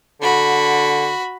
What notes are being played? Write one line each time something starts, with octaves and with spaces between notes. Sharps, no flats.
D3 F#4 B5